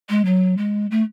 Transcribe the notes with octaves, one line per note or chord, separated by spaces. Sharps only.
G#3
F#3
G#3
A3